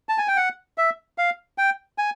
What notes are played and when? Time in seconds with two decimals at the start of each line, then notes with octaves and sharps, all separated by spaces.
0.09 A5
0.18 G#5
0.28 G5
0.37 F#5
0.78 E5
1.18 F5
1.58 G5
1.98 G#5